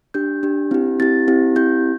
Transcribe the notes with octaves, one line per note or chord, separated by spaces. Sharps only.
D4 G4 G6
D4 G4
C4 E4 G4
C4 E4 G4 A6
C4 E4 G4
C4 E4 G4 G6